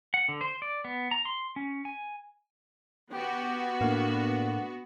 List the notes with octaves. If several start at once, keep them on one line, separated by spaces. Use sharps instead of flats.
F#5
D3
C5
D5
B3
A#5
C6
C#4
G#5
B3 F#4 G4
A2 A#3 D4